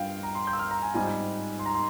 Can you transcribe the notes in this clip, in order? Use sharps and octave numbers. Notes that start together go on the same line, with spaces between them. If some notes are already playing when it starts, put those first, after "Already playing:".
Already playing: G2 G3 F4 F5 G5
A#5
C6
G6
E6
F6
A#5
G#5
G#2 G3 C4 F4 G#5
C6
A#5
C6